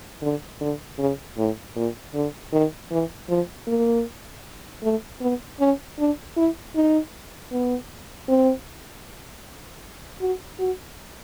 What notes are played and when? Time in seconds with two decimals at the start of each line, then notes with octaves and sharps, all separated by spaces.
0.22 D3
0.60 D3
0.99 C#3
1.37 A2
1.76 A#2
2.14 D3
2.53 D#3
2.91 E3
3.29 F3
3.68 A#3
4.83 A3
5.21 B3
5.60 C#4
5.99 D4
6.36 E4
6.75 D#4
7.52 B3
8.28 C4
10.21 F#4
10.59 F#4